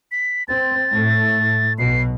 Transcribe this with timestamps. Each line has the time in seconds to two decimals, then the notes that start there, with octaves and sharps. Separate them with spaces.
0.12 B6
0.48 C4 A6
0.90 A2 A3
1.79 B1 B2 C7